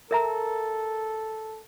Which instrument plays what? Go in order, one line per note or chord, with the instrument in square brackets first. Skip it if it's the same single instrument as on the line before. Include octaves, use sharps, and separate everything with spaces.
[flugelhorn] A4 [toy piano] A#4 E5 A#5